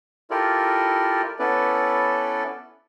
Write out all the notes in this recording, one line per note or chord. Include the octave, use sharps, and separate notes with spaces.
E4 F4 G4 A4 A#4 D5
B3 C#4 E4 A4 B4 D5